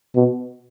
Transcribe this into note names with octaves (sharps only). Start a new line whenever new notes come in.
B2